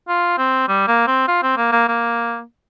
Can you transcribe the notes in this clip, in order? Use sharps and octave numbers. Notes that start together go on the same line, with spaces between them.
F4
C4
G3
A#3
C4
F4
C4
A#3
A#3
A#3